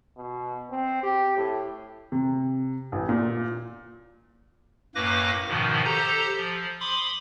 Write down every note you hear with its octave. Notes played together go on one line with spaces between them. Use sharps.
B2
C4
G4
A2
C3
A1
A#2
F#2 A2 A#3 B4 D6 A#6
G#2 B2 D#3 F3
G4 A4 C5 A#5
F3
B5 C6 D6 D#6